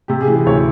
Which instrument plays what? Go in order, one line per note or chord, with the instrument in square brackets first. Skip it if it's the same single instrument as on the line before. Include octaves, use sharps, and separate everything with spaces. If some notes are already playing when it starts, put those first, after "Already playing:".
[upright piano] C3 G4
G#4
E3
G#4
D2 C#5